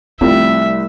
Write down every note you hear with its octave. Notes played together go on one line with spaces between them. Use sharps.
C2 F3 G3 A3 E5